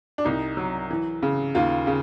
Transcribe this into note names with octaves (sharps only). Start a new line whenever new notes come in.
D4
C2 D#4
F#3
E3
C#3
D#2 F4
C#3